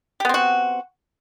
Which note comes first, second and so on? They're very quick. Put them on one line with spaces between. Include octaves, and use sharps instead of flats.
G4 B3 C4 F#4